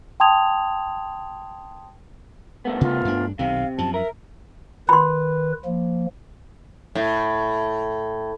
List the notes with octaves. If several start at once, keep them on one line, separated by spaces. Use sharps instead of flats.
G5 A5 C6 D#6 G#6 F7
C2 A3 B3
C3 F4
G2 D4
B1 C3 D#3 F5
F#2 F3 A5
A#4 E5
D#3 B4 B5 C6
F3 A#3
A2